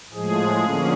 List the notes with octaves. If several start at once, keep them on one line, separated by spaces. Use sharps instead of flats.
A2 F3 G#3 G#4
D3 F3 A#3 C#4